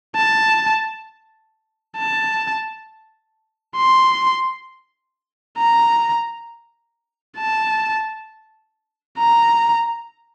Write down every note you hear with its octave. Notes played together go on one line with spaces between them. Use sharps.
A5
A5
C6
A#5
A5
A#5